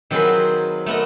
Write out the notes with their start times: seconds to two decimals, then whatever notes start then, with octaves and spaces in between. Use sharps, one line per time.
0.11 D#3 F#3 C4 F4 G#4 B4
0.86 A3 B3 A#4 D#5